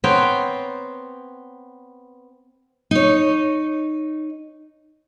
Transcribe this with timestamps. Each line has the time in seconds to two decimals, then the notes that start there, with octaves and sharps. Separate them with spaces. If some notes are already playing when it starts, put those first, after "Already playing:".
0.04 B3 C4 C5 C#5 G5 A#5
2.91 D#4 C#5